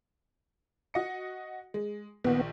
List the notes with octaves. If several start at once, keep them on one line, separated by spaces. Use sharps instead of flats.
F#4 D#5 C#7
G#3
A#1 D#3 B3